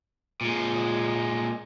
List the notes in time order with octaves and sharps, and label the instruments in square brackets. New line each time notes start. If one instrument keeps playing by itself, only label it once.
[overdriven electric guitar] A#2 G#3